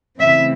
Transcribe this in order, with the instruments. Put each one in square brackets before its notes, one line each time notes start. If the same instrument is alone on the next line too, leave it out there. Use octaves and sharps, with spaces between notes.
[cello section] C#3 E3 A3 C4 E4 E5